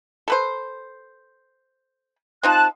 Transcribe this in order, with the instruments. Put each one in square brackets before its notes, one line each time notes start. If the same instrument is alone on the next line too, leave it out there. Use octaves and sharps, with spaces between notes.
[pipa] A4 B4 C5
[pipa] C4 D#4 F4 [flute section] A5 F#6